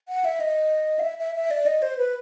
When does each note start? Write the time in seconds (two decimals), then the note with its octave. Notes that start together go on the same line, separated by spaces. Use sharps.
0.08 F#5
0.25 E5
0.40 D#5
0.99 F5
1.03 E5
1.18 E5
1.35 E5
1.51 D5
1.66 D#5
1.82 C5
1.97 B4